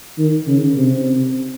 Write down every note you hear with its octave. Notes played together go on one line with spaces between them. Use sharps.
D#3
C#3
C3